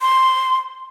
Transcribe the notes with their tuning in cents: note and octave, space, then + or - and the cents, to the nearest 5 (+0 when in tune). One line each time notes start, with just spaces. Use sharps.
C6 +0